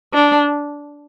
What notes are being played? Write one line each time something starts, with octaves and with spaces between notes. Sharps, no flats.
D4